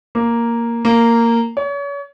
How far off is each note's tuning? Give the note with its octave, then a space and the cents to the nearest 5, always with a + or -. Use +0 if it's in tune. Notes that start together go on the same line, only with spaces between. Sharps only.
A#3 +0
A#3 -10
C#5 +35